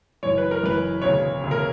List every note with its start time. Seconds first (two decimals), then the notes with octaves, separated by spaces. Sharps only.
0.23 F#1 F#2 E3 C#5
0.38 B4
0.51 A#4
0.63 F#1 F#2 E3 B4
1.02 E1 D2 C#3 C#5
1.41 E1 D2 C#3
1.51 A#4